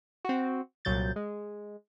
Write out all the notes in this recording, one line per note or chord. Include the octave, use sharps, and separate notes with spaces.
C4 F#4
C2 A#2 F#3 G6 A6
G#3